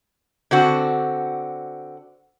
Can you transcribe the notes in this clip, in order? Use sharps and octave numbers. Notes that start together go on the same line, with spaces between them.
D3 C4 F#4